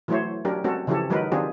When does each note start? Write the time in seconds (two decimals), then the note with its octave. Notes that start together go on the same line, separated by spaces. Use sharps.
0.08 E3 F#3 A3 E4 C5 C#5
0.45 F#3 C#4 D4 G4 A#4
0.64 G#3 C4 C#4 F#4 A4
0.87 C#3 E3 F3 C#4 G4 A4
1.10 D#3 F#3 G#3 D#4 A#4 B4
1.32 D#3 C4 D4 F4 G4 G#4